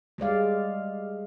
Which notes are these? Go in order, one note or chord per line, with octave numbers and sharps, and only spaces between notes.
G3 G#3 D5 F5